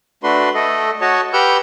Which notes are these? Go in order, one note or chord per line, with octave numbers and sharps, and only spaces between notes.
A3 D4 F#4 B4 C6
A3 A4 D#5
F#4 C#5 D#5 A5
G4 B4 F#5 E6 F6 G6